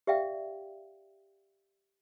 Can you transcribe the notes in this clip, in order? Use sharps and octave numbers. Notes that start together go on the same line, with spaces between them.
G4 D5 E5 F5 G5